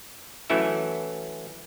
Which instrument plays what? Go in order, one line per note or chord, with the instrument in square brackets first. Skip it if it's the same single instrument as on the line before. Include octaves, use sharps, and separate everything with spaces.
[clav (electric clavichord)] E3 F#3 A3 C#4 E4 E5